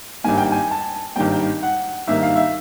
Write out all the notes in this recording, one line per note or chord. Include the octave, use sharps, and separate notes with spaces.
G#1 G2 D#3 G3 A#3 G#5
G5
G#5
A5
G#1 G2 D#3 G3 A#3 G5
F#5
G#1 G2 D#3 G3 A#3 E5
F5
E5